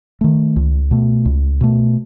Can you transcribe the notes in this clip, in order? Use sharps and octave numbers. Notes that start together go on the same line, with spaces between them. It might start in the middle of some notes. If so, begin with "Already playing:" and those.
D#3 A3
C#2
B2 A3
C#2
B2 A3